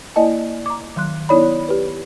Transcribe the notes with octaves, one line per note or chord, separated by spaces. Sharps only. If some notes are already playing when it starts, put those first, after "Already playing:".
A#3 E4 D5 D#5 G#5 A5
A#5 D6
D#3 F#3 C6 F#6
B3 D#4 E4 C#5 D5 B5
G4 B4